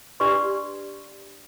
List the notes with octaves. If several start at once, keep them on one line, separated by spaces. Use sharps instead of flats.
D4 G4 B4 D5 C6 C#6